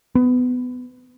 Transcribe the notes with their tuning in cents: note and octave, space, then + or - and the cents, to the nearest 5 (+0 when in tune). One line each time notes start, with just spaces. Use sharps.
B3 +20